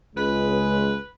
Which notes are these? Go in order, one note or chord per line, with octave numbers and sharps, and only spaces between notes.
C#2 G#3 B4